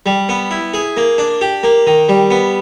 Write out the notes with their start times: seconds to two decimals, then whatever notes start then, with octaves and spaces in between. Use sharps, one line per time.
0.06 G3
0.29 B3
0.51 E4
0.74 G#4
0.97 A#3
1.18 D4
1.41 G4
1.63 A#3
1.87 D#3
2.09 G3
2.30 B3